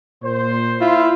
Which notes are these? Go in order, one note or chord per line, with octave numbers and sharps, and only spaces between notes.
A#2 C5
E4 F4